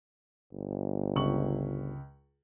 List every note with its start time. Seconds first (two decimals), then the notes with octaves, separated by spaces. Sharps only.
0.53 G1
1.16 C#2 C#6 F#7